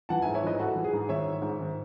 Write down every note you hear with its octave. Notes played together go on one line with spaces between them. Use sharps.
E3 F#5 A5
G#2 E5 G#5
C#5 E5
E3 B4 D#5
G#2 F#4 A4
E3
G#4
G#2
D#3 C#5 E5
G#2
G#2
D#3